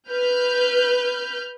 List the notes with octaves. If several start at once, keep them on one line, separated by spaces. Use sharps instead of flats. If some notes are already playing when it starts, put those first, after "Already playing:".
B4 F6 G6